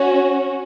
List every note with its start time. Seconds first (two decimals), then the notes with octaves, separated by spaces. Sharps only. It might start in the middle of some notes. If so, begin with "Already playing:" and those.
Already playing: C#4 F#4